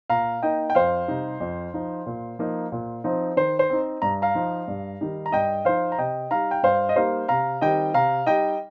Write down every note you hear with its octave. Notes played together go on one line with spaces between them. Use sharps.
A#2 F5 A#5
A#3 D#4 D#5 G5
G5
F2 C5 F5
C3 G3 D#4
F2
F3 D#4
A#2
F3 A#3 D#4
A#2
F3 C4 D#4
D#3 C5
C5
C4 D#4
G2 A#5
F5 A#5
F3 D#4
G2
D#3 G3 D#4
A#5
G2 D#5 G5
F3 D#4 C5 F5
A#5
C3 D#5 G5
G3 D#4 F5 A#5
G5
G2 C5 F5
D#5
G3 A#3 D#4 C5 F5
C3 F5 A#5
D#3 G3 C4 D#5 G5
C3 F5 A#5
G3 D#4 D#5 G5